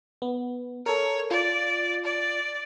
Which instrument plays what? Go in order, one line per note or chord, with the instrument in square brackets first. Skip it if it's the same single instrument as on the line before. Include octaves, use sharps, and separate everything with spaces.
[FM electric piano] B3
[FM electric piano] A4 A#4 [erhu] C#5
[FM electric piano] F4 [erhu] D5
[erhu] D5